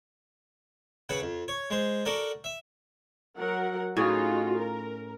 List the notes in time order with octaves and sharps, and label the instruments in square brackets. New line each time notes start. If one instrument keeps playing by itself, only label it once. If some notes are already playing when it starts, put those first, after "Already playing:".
[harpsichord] C#3 B4 F#5
F2
C#5
G#3 C5
F#4 A4 A#4 D5
E5
[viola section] F#3 A#4 F#5
[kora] A2 C#4 G#4 [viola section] D#4 F4 F#4
[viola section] A#4